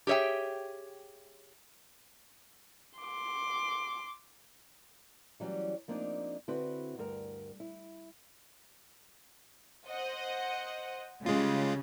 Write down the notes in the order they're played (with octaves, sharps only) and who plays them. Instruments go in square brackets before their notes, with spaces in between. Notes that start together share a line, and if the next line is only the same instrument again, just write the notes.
[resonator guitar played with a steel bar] G4 G#4 C#5 E5 G5
[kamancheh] C6 D6
[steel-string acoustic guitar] E3 F#3 G3 C#4
F3 A#3 C4 D4 D#4
D3 C4 E4 F#4 B4
D2 G2 A#4
E4
[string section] C5 D#5 F#5
[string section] C#3 G3 [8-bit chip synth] G#3 F4